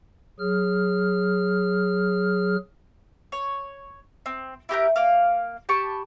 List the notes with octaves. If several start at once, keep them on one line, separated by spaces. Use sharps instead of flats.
F#3 G#4 F6
C#5
C4
E4 G4 A#4 G6
A#3 F5
G4 A5 B5 C#6